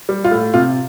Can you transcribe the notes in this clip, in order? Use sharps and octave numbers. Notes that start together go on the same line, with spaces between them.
G3
F4
A2
C3 F4